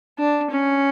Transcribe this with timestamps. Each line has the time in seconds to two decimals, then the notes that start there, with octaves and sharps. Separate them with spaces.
0.18 D4
0.51 C#4